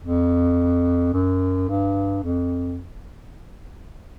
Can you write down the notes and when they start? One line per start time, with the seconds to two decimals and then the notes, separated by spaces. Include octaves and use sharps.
0.03 F2
1.13 F#2
1.68 G2
2.24 F2